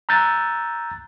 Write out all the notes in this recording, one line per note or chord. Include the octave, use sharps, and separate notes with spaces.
A#5 E6 F#6 G6 A6